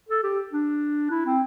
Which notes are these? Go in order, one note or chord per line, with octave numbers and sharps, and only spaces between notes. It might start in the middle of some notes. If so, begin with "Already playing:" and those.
A4
G4
D4
E4
C4